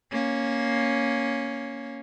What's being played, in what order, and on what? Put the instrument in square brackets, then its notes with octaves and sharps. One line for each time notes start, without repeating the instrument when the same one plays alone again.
[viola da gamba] A#3 C#4